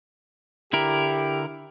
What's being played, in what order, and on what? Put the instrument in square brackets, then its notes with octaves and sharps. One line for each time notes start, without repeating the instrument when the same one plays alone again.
[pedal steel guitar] D3 E4 A#4 [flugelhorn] G4